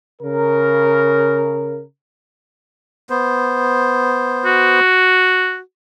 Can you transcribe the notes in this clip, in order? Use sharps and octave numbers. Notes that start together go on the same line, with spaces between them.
C#3 A#4
B3 C5
F#4